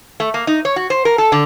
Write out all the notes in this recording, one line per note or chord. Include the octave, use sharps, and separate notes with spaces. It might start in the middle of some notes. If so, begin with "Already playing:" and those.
A3
A#3
D#4
C#5
F#4
C5
A#4
A4
D3